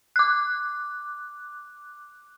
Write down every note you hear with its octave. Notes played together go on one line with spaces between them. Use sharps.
D6 F#6